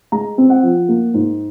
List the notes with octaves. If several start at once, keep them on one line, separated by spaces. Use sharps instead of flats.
G#3 A#5
C4
F#5
F3
A#3
G#2